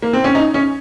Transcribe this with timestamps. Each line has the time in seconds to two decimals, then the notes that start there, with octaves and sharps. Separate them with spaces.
0.02 A#3
0.13 C4
0.24 C#4
0.35 D#4
0.54 C#4